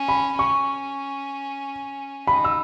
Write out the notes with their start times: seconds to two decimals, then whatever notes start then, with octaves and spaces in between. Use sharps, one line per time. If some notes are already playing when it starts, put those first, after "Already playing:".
Already playing: C#4
0.08 B5
0.39 C#4 C#6
2.27 D#4 B5
2.44 E6